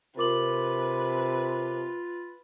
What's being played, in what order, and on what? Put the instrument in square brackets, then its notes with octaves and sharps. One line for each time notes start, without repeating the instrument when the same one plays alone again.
[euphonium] C3 [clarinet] F4 [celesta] A#4 D6 F#7 [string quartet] B4